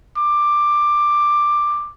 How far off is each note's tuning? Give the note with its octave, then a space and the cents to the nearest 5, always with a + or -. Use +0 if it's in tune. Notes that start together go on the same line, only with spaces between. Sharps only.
D6 +10